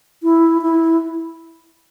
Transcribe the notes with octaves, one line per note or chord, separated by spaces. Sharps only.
E4
E4